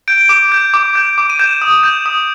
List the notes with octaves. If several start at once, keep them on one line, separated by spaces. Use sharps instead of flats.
G6 D7
D6
G6
D6
G6
D6
D#7
G6 E7
D#6
G6
D#6